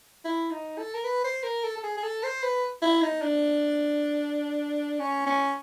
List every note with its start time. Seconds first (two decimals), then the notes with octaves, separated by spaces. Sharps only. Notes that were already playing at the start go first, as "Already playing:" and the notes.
0.25 E4
0.51 D#4
0.78 A4
0.94 A#4
1.04 B4
1.24 C5
1.43 A#4
1.64 A4
1.77 A4
1.83 G#4
1.97 G#4
2.03 A4
2.23 C5
2.43 B4
2.82 E4
3.02 D#4
3.22 D4
4.99 C#4
5.26 C#4